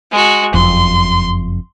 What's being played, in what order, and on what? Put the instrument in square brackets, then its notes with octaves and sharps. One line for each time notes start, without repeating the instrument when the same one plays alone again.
[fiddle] G#3 F#4
[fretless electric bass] F#1 F2 [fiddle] C6